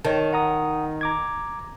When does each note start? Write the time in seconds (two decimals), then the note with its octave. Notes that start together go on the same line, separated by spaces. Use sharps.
0.05 D#3 C#5 D#5 A5
0.33 F#5 A#5 D#6
1.01 A#5 D6 G#6